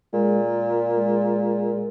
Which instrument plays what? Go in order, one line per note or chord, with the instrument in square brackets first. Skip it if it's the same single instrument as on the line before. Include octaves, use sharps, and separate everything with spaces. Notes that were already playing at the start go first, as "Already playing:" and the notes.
[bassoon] A#2 [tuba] G#3
[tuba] G#3